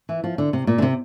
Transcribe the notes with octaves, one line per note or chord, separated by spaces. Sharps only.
E3
F3
D3
C3
A#2
D3
C3